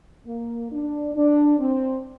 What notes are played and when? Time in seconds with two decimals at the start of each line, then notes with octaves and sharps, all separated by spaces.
0.26 A#3
0.71 D4
1.15 D4
1.59 C4